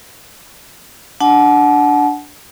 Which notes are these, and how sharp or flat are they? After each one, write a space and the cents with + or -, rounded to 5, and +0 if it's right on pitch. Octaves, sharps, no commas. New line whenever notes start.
D4 -5 F#5 +0 A5 -40